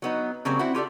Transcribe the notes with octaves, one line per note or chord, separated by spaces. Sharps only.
F#3 B3 D#4
C#3 F#3 G3 A#3 C4
C4 E4 F#4
F4 G4 A4 D5